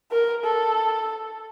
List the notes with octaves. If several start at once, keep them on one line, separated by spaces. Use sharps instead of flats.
A#4
A4